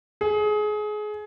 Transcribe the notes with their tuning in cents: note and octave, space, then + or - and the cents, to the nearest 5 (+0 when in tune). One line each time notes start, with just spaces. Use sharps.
G#4 +25